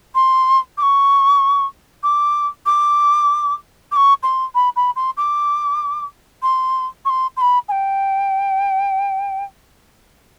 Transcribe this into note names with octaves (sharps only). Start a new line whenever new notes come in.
C6
D6
C#6
D6
D6
D6
C#6
C6
B5
B5
C6
D6
C6
C#6
C6
C6
B5
G#5
G5